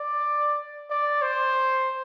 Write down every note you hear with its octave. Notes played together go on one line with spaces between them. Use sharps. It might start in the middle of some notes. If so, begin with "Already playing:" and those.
Already playing: D5
D5
C5